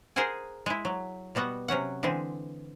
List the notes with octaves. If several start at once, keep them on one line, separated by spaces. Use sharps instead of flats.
G#4 A#4 C5 D#5 F#5 G#5
G#3 E4
F#3
B2 G3 B3 F#4 F#5
C3 F#3 C#4 F#5
D3 E3 G#3 C4